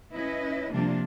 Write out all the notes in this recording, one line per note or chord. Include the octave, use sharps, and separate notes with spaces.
C#4 E4 B4 D#5
C3 F3 G3 A#3 D4 F4